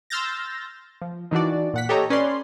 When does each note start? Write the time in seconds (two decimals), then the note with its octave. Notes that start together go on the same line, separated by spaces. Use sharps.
0.10 C6 E6 F6 G6 A6 A#6
1.01 F3
1.31 D#3 E3 D4 F#4 D5
1.74 A#2 F#5 B6
1.89 G4 A4 C#5 D#5 A#5
2.10 C#4 B4 D5 C6